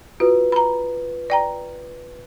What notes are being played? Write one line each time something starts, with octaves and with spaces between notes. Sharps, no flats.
F4 F#4 B4
A#5 B5
D5 G5 A#5